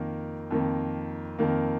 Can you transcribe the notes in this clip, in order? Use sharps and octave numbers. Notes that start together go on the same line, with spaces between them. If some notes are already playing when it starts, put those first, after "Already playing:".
Already playing: F2 D#3 A#3
F2 D#3 A#3
F2 D#3 A#3